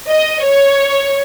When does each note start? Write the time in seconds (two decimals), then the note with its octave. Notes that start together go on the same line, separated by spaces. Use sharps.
0.09 D#5
0.44 C#5